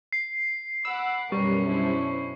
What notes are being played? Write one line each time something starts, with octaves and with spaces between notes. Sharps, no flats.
C7
F#5 B5 D6 E6
F#2 B2 G3 C#4 A#4 B4 C#6
D4 E4 C5